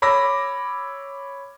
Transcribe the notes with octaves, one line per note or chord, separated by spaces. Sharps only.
C#5 B5 D6 E6 A#6